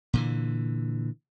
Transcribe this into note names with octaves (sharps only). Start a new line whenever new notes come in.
A#2 D3 E3